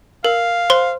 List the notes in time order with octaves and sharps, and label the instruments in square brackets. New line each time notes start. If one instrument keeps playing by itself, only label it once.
[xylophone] A#4 [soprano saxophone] F5
[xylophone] C5 C6